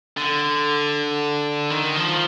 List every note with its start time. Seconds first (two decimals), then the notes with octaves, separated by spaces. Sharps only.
0.17 D3
1.70 D#3
1.96 F3